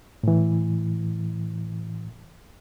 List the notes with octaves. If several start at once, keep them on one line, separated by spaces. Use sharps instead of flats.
A2 E3